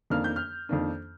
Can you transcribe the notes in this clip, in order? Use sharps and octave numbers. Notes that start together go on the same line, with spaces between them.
F2 D#3 A#3 D4 F6
G6
F6
F2 D#3 A#3 D4